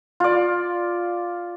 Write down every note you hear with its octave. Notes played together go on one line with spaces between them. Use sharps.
F4 D5